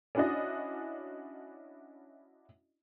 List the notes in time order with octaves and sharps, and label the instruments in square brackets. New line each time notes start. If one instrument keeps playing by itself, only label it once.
[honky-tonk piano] C#4 D4 E4 F#4 D5 D#5